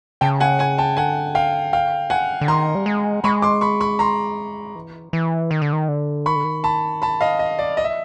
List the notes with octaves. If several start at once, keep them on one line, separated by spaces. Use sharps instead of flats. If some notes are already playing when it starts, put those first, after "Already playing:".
C#3 G5 A5
F#5 G#5
F#5 G#5
G5 A5
D3 F#5 G#5
F5 G5
F5 G5
F#5 G#5
D3
D#3 A#5 C6
G3
G#3
G#3 B5 C#6
C6 D6
B5 C#6
B5 C#6
A#5 C6
E3
E3
D#3
D3
D#3
D3
D#3 B5 C#6
D3
D#3
A5 B5
A5 B5
D#5 F5
D#5
D5
F3 D#5
E5